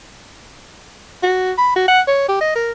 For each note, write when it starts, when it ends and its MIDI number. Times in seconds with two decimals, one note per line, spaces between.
1.23 1.52 66
1.58 1.73 83
1.76 1.86 66
1.88 2.01 78
2.07 2.26 73
2.28 2.38 67
2.41 2.53 75
2.55 2.72 70